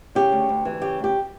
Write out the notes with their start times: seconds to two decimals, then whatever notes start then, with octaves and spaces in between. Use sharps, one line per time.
0.15 C#3 G4
0.32 D2
0.49 D2
0.65 E3
0.82 C#3 G4
0.99 D2 G4